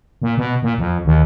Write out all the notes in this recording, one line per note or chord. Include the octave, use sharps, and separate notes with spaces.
A#2
B2
A#2
F2
D#2